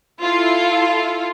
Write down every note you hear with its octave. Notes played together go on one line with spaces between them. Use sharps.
E4 F4 A4